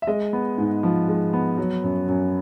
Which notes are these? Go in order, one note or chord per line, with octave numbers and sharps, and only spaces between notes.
E5
G#3 D#5
B3
G#2
F3
G#3
B3
F#3
F#2
F#2